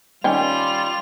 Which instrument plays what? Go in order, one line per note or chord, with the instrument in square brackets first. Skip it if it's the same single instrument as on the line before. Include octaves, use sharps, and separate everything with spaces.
[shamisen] D#3 C#4 G5 [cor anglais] G3 [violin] F4 F7